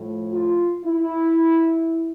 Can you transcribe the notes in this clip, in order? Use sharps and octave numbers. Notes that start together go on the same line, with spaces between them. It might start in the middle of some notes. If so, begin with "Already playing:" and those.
Already playing: A2 F3
F4
E4